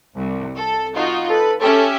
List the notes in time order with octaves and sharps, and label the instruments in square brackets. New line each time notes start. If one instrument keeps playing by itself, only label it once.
[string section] C2
A4
D#4 F4 F#4
[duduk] A4 [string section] B4
[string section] C#4 G4 E5 [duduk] A4